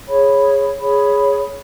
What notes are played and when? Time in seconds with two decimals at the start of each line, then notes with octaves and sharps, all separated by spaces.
0.08 G#4 C#5 B5
0.79 G#4 C#5 B5